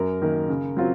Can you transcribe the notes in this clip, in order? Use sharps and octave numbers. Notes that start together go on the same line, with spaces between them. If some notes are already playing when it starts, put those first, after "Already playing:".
Already playing: F#2 A#4
D#3 A#3
C#3
F#3 C4 F4